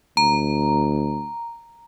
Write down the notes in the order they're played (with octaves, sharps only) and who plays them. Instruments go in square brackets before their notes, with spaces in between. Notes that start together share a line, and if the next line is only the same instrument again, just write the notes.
[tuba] D2 [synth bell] A#5